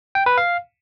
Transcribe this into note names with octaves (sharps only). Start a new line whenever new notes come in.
G5
B4
F5